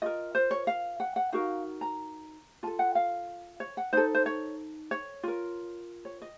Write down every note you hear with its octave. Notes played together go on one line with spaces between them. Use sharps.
F4 A#4 D#5
C5
C#5
F5
F#5
F#5
D#4 F#4 A#4 F5
A#5
F4 A4 A5
F#5
F5
C#5
F#5
D#4 A4 C5
C5
C#5
C#5
F4 A#4
C#5
D#5